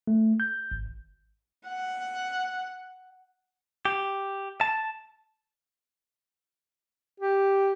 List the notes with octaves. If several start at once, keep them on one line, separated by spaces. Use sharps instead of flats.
A3
G6
G#1
F#5
G4
A5
G4